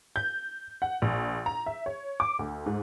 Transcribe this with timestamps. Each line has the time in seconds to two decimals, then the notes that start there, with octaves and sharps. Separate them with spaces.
0.16 G6
0.82 F#5
1.02 A#1
1.46 A#5
1.66 E5
1.86 C#5
2.20 D6
2.39 D2
2.66 G#2